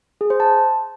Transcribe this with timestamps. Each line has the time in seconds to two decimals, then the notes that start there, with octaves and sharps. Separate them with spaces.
0.21 G#4
0.30 C5
0.40 A5